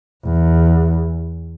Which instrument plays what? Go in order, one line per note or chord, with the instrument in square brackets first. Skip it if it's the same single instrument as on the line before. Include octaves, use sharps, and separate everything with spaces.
[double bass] E2